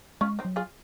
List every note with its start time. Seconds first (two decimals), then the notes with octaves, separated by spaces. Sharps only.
0.21 G#3 C#4 F4
0.39 C4 D#4
0.45 F#3
0.56 F4 G#4